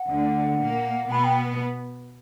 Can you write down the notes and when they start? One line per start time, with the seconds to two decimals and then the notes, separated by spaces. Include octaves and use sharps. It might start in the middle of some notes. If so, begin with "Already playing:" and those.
Already playing: F#5
0.09 D2 D3
0.60 A#2 A#3
1.11 B2 B3 B5
1.24 G5